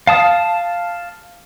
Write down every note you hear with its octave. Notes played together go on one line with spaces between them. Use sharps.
F5 A5 D#6